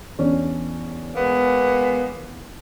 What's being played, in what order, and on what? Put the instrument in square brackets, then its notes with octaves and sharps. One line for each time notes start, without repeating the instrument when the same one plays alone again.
[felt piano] E2 C#4 D4
[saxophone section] G#3 A#3 B3